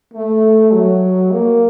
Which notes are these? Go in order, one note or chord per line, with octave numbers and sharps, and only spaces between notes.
A3
F#3
A#3